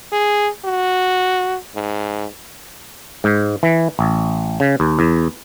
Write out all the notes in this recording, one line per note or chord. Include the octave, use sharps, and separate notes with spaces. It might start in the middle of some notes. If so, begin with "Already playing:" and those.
G#4
F#4
G#2
G#2
E3
A1
C#3
D#2
E2